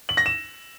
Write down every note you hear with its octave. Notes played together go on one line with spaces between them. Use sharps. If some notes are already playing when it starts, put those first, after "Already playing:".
F#7
A#6
E7